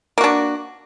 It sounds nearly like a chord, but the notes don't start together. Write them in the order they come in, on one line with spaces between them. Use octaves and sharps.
A#3 F#4 D4